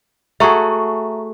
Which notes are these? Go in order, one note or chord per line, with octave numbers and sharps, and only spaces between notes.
A3 F#4 G#4 E5 A#5 C#6